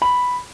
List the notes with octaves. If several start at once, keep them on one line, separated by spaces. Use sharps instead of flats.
B5